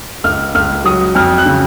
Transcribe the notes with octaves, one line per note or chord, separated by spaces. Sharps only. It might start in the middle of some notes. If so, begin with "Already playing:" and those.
C#2 F6
C#2 F6
F#3 D#6
F2 F6
F#6
C#3